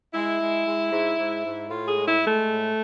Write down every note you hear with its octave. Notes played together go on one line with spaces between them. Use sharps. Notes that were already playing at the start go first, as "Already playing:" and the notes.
G#3 E4
G#3
G#3
G#2
G#2
G#2
A2 F4
G#4
G#3
E4
G#3
A3
A2